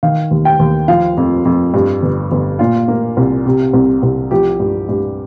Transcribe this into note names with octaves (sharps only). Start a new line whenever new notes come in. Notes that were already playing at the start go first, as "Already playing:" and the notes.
D#3 F5
D#2
G5
D#2
F3 F5
F2
F2
G2
G1
G1
A#2 F4
A#3
C2
C3
C2
C2
F3 G4
G2
G2